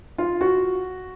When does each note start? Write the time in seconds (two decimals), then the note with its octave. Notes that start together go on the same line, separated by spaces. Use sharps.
0.18 F4
0.41 F#4